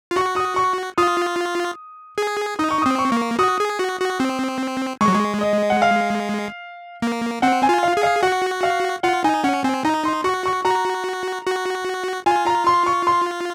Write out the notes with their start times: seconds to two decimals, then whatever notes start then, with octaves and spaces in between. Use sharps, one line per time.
0.11 F4
0.16 F#4 C#6
0.36 D#6
0.56 C#6
0.98 F4 D#6
2.18 G#4
2.59 D#4 D#6
2.71 C#6
2.82 C4 D#6
2.99 C#6
3.12 A#3
3.39 F#4 D#6
3.60 G#4
3.79 F#4
4.00 F#4
4.20 C4
5.01 G#3 C#6
5.08 F#3
5.15 G#3
5.41 D#5
5.70 F#5
5.82 F5
7.02 A#3
7.42 C4 F#5
7.63 G#5
7.69 F4
7.83 F5
7.97 G#4
8.03 F5
8.23 F#4 F#5
8.63 F5
9.03 F4 F#5
9.24 D#4 G#5
9.44 C#4 F#5
9.64 C4 G#5
9.85 D#4 A#5
10.05 C6
10.24 F#4 C#6
10.46 C#6
10.65 F#4 A#5
11.46 F#4
12.26 F4 G#5
12.46 A#5
12.67 C6
12.86 C#6
13.07 C6